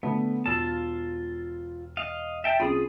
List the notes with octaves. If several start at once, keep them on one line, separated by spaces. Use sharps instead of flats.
D3 A3 B3
E1 F4 A5 E6
D#5 F5
E5 G5 A5
C2 C#4 F4 G#4 B5 D#6